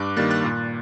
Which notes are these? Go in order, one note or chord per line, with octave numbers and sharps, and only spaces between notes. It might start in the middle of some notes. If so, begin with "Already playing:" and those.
Already playing: G2 D6 F#6
D#3 G3 A#3 F#6 A6
F#6 A6
A#2